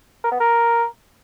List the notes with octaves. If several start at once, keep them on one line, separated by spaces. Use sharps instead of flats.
A#4
B3
A#4